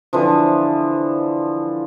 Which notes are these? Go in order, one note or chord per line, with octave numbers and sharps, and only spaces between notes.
D3 E3 F3